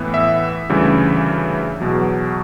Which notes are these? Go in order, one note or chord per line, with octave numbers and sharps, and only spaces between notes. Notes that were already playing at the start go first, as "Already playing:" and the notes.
Already playing: A2 E3 B3 E4
E5
D2 C#3 E3 G3 D4
E2 B2 F#3